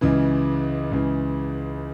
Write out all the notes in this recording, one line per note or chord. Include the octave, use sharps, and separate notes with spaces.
C#2 C#3 E3
C#2 C#3 E3